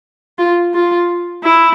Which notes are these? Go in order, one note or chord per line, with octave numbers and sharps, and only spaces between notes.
F4
F4
E4